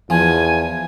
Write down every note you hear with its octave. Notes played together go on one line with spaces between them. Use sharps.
E2 F3 G#5